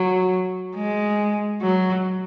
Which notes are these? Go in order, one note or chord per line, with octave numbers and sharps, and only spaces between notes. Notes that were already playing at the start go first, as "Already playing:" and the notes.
Already playing: F#3
G#3
F#3